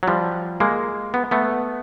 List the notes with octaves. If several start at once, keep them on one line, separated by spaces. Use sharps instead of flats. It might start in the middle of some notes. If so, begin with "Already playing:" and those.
F#3
F3 G3
G#3 A#3
B3
A3 B3